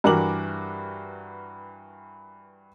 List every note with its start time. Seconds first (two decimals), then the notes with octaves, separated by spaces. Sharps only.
0.04 G2 E3 F#4 A#4 D6 F#7